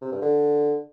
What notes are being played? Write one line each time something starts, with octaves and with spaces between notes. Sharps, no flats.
C3
G2
D3